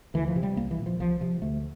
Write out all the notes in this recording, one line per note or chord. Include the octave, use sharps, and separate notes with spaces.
D2 E3
F3
C3
G3
C2 A#3
E3
A#2
F3
C2 F3
C3 F3
D2 A3